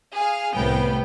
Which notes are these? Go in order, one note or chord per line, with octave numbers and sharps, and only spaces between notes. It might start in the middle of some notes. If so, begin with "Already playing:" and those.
G#4 F5
C2 A2 B3 G5